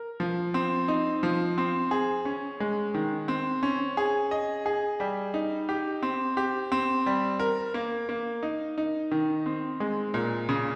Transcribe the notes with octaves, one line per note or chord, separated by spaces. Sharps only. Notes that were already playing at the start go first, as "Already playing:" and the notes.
Already playing: A#4
F3
C4
D#4
F3
C4
G#4
C#4
G#3
D#3
C4
C#4
G#4
D#5
G#4
G3
D#4
G4
C4
G4
C4
G3
A#4
A#3
A#3
D#4
D#4
D#3
C4
G#3
A#2
C#3